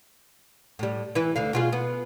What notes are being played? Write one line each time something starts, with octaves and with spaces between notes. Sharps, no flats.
A2 G3
E3 E4 B4
D2 D3 F5
B2 F4 G#4
B3